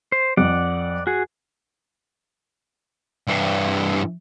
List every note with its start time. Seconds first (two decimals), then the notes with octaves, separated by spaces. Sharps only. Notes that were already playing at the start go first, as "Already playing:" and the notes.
0.12 C5
0.37 F2 D5 F#5
1.07 F#4 G#4
3.28 G2 E3